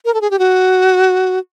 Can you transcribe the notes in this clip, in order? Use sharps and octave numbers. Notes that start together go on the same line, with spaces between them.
A#4
A4
G#4
G4
F#4